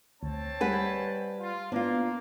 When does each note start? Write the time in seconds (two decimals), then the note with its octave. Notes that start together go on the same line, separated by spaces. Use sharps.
0.23 D2 C4 C#5 A5
0.61 G3 B4 F#5 G#5
1.40 F4
1.72 A#3 B3 D4 F4